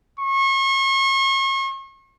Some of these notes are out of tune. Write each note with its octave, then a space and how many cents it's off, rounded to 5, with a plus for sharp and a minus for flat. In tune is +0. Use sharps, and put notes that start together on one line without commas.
C#6 -40